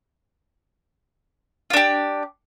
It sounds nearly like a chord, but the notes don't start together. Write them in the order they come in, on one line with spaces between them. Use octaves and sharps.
F4 D4 G4